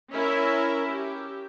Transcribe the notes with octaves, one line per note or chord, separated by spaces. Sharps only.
C#4 E4 A#4 E5
G4